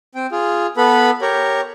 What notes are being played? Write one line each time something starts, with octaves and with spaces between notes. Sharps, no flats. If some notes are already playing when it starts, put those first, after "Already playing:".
C4 G5
F4 G#4
B3 A4 B4 B5
G4 A#4 C#5